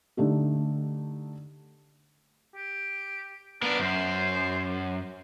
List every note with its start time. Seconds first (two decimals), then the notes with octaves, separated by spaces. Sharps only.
0.17 D3 A3 D4 D#4 G4
2.56 G4
3.62 B3 D4 A#4
3.80 F#2 C5